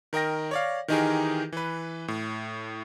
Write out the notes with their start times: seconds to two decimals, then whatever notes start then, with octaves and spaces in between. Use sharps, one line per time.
0.13 D#3 A#4 D#5 G5 A#6
0.51 C#5 D5 F5
0.88 D#3 E3 D#4 G4 G#4 A#4
1.52 E3 B4
2.08 A2